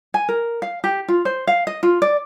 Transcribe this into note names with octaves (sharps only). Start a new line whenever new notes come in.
G#5
A#4
F5
G4
F4
C5
F5
D#5
F4
D5